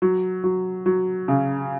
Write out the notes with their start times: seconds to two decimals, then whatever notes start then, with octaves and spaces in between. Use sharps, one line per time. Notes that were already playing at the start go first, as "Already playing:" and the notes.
0.02 F#3
0.44 F#3
0.86 F#3
1.28 C#3